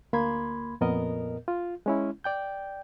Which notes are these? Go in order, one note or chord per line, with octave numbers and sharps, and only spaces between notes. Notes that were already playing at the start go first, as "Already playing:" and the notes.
D2 A#3 B5 C6 G#6
F2 A#2 B3 A#4 D#5
F4
G#3 C#4 E4
D5 G5 G6